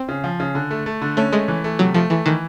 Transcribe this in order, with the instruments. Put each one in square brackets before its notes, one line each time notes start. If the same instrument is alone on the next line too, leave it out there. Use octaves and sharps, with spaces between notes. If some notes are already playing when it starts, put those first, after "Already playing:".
Already playing: [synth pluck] C4
[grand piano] C#3
F3
C#3
D3
A3
A3
D3
[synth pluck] A3 [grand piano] C#4
[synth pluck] G#3 [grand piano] A3
[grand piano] E3
A3
[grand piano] C3 [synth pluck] F#3
[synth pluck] F3 [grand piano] A3
[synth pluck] E3 [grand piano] A3
[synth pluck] D#3 [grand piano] E3